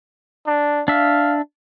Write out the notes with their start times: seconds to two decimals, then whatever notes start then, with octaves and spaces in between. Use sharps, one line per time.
0.47 D4
0.88 D4 E5 F5